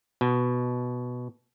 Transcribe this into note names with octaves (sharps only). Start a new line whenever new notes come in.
B2